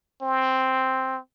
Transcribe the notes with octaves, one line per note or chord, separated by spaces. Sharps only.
C4